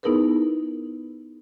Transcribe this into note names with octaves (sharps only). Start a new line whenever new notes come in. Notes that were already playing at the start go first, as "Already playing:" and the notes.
B3 D#4 E4 G#4 A#4 B4